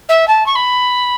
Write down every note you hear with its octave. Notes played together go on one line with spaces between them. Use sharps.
E5
A5
C#6
B5